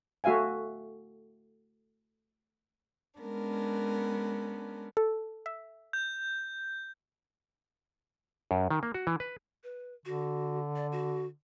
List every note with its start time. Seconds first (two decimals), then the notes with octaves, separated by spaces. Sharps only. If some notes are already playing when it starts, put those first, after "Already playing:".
0.24 A3 F#4 E5 F5 G#5
3.20 G#3 B3 C#4 D4 A#4
4.97 A4
5.46 E5
5.93 G6
8.51 F#2
8.71 D#3
8.83 A#3
8.94 F#4
9.07 E3
9.20 B4
9.64 B4
10.05 D3 F#4
10.75 D5
10.92 F#4